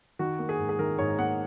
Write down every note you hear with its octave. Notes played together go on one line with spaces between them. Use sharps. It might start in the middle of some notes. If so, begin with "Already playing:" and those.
D#3 F#4
A#3
G#4
G#2
G#4
D#3 A#4
G#2 C#5
A#3 F#5